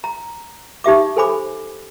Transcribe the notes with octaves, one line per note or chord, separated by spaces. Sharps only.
A#5
D#4 G4 E5 D6
A4 C5 G#5 B5 D6